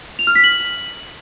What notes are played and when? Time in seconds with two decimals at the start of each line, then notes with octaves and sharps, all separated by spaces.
0.19 F7
0.27 F6
0.35 B6
0.44 F#7